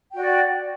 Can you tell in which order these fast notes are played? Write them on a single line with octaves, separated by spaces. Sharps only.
G5 F#4 D5